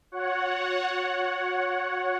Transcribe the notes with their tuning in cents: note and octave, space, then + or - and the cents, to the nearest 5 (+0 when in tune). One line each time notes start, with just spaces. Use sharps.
F#4 -35 C#5 +0 F#5 +0